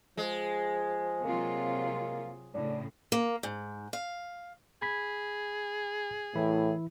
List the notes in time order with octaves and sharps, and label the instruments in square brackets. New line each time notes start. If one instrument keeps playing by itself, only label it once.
[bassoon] F3 [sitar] G#3
[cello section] C3 F#3 F4 [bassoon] A#3
[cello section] A2 C#3 [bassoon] D4
[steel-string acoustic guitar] A#3
G#2
F5
[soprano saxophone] G#4 [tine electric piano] B5 G#6 B6
[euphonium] A2 [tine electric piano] E3 E4